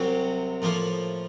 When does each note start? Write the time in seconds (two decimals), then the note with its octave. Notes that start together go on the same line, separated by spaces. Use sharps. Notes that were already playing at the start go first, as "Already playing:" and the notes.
Already playing: C2 C3 F#3 C4
0.62 A2 F3 A#3